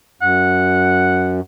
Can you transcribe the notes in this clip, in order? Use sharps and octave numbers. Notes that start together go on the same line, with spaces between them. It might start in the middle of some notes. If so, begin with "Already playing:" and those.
F#2 F#5